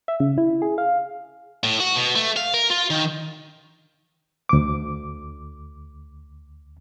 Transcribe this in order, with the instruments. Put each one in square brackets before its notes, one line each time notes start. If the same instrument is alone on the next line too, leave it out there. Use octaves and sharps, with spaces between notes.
[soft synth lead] E5
C#3
E4
G#4
F5
[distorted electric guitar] A2
F#4
B2
A3
F5
A#4
F4
D#3
[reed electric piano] D2 D6